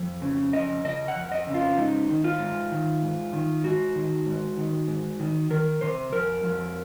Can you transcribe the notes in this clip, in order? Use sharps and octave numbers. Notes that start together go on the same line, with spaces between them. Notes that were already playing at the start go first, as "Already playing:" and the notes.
Already playing: F2
C#3
F2 D#5
C#3 D#5
F#5
F2
D#5
C#3
F4
G#2 D#4
D#3
F4
G#2
D#3
G#2
D#3
G#2 F#4
D#3
G#2
D#3
G#2
D#3
D#3 A#4
C3 C5
F2 A#4
F2